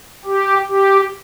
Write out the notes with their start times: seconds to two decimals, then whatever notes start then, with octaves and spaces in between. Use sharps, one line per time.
0.25 G4
0.68 G4